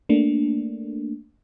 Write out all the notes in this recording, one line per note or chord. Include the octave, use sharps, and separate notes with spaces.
A3 A#3 D4